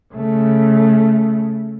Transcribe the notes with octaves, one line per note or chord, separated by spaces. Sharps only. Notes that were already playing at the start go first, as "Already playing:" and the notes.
C#3 A3